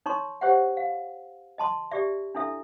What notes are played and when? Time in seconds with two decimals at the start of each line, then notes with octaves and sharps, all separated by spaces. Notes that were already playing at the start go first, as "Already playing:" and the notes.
0.06 D#4 C#5 A#5 C6 C#6
0.41 G4 C5 C#5 E5 F#5
0.77 F5
1.58 D#5 A5 C6
1.91 G4 D5 E5
2.35 D4 E4 A4 E5